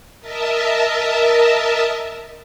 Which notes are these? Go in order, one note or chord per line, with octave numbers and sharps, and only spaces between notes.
A#4 D#5 E5 A5